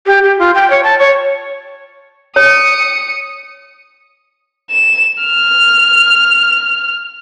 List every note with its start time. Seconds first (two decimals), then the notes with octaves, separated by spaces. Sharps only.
0.07 G4
0.23 G4
0.39 F4
0.55 G5
0.70 C#5
0.84 A5
0.99 C#5
2.36 C#5 D#6 C#7
4.70 E7
5.23 F6